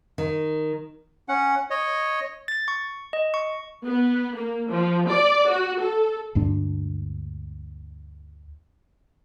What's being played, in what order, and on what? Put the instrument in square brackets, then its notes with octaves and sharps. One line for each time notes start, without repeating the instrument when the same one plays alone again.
[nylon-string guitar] D#3
[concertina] C#4 F#5
C#5 D#5
[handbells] A6
C#6
D#5
C#6
[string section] B3
A#3
F3
D5
F#4
A4
[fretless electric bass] D2 G2 G#3 D4